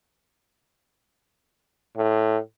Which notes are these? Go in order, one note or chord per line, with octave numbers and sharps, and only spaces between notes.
A2